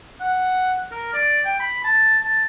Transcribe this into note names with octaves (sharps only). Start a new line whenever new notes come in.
F#5
A#4
D5
G5
B5
A5
A5